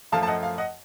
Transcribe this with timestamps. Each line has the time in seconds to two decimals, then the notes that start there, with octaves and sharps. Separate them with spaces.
0.12 F#2 F3 A3 F5 A5
0.23 A5
0.27 D#5 F#5
0.43 F5
0.58 D#5 F#5